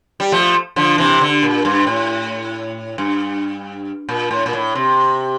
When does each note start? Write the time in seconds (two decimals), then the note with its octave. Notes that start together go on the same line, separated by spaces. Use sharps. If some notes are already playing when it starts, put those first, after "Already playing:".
0.20 G3
0.32 F3 A3
0.76 D3 F3
0.98 C3 E3
1.21 D3
1.43 A#2
1.65 G2
1.87 A2
2.98 G2
4.09 A#2
4.31 A2
4.46 A#2
4.53 A2
4.75 C3